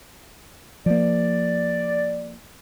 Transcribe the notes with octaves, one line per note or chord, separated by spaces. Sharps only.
F3 A#3 D5